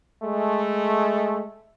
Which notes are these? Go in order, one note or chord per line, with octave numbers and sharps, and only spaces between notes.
G#3 A3